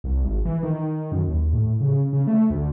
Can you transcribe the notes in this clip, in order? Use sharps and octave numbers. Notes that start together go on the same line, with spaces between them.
C2
G#1
E3
D#3
F#2
D#2
A2
C#3
C#3
A3
D2